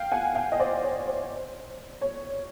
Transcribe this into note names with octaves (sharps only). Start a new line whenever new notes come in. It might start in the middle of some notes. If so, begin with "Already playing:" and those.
Already playing: F5 G5
F#5 G#5
F5 G5
D#5
C5 D5
C#5
C5
C#5